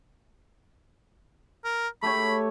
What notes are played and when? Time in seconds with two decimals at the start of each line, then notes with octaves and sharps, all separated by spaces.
1.65 A#4
2.03 A3 G4 C#5 B5